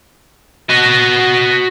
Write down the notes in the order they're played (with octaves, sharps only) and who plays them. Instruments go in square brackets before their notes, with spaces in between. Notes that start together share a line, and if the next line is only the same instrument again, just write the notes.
[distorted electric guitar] F#4 D#5